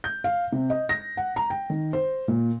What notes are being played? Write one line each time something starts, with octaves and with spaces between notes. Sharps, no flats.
G6
F5
C3
D#5
A#6
F#5
A#5
G5
D#3
C5
A#2